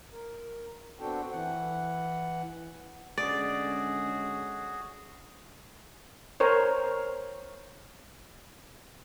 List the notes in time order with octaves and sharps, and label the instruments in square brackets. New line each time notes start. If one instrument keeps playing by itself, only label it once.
[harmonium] A#4
B3 C4 D4 F#4 A4 G5
E3 F#5
[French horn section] D3 G#3 C#4 [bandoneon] F#4 G#4 [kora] D5
[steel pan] A#4 C5 C#5